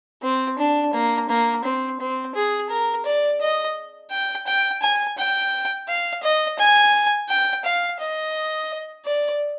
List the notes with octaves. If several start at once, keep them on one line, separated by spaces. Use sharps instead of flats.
C4
D4
A#3
A#3
C4
C4
G#4
A#4
D5
D#5
G5
G5
G#5
G5
F5
D#5
G#5
G5
F5
D#5
D5